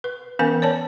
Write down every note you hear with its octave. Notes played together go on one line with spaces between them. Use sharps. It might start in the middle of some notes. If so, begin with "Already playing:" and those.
B4
E3 B3 C#4 A#4 F5 G#5
C#5 D5 A5